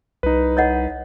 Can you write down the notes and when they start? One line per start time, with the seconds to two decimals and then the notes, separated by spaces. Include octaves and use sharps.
0.23 C2 D#4 B4
0.57 C#5 D#5 F#5